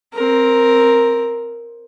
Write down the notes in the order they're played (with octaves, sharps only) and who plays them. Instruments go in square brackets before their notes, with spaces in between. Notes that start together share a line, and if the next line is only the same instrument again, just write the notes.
[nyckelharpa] C4 A#4